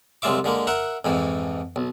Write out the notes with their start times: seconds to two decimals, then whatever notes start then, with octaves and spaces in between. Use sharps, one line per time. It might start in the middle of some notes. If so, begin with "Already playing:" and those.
0.22 C2 F#3 G#3 F4 E5 D6
0.44 D3 G#3 A#3
0.67 A#4 E5 F#5
1.05 F2 G#2 E3
1.76 B1